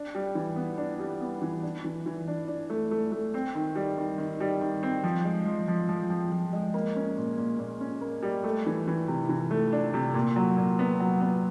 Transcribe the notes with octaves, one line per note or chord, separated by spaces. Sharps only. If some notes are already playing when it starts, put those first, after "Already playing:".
Already playing: D4
G3
E3
B3
D4
G3
B3
E3
D4
E3
E3
D4
D4
A3
A3
A3
C4
D#3
G3
D#3
D#3
G3
D#3
C4
F3
G#3
F3
F3
F3
F3
F3
G#3
A#3
C#4
A#2
A#2
A#2
C#4
A#3
G3
A3
E3
E3
C3
E3
A3
D4
C3
A#2
F#3
A#2
B3
F#3
B3